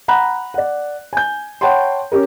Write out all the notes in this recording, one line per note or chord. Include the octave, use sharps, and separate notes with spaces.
F#5 A#5 B5 F#6
D5 F#5
G#5 G6
C#5 F#5 G5 A5 B5 C6
C#4 G4 A#4